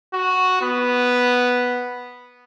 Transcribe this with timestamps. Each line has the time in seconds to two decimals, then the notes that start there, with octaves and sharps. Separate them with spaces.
0.13 F#4
0.61 B3